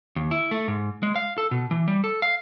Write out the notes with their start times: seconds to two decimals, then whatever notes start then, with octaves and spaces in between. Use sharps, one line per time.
0.16 D#2
0.31 E4
0.51 A3
0.68 G#2
1.03 G#3
1.16 F5
1.38 A4
1.51 B2
1.71 E3
1.88 G3
2.04 A4
2.22 F5